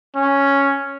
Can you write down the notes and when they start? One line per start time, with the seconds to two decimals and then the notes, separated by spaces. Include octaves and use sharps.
0.15 C#4